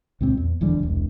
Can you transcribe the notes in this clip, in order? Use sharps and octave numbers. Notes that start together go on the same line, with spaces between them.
C#2 A#2 G3 C4
E2
E1 E2 D3 G3
E1 C2